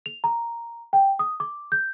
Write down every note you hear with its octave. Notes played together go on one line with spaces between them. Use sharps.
F7
A#5
G5
D#6
D6
G6